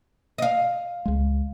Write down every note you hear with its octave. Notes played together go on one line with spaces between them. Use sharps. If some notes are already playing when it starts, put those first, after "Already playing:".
D#5 F5
C#2 G#3